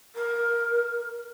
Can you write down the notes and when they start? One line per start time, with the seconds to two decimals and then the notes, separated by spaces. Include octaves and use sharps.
0.15 A#4